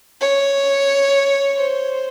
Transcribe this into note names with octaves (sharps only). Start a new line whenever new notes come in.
C#5
C5